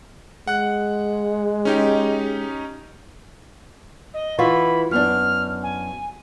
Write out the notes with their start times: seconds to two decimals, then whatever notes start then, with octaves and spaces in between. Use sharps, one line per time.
0.47 G#3 F#5 F#6
1.65 C#4 D#4 G4
4.13 D#5
4.38 E3 F4 F#4 B5
4.91 F#2 B3 D4 F6
5.63 G#5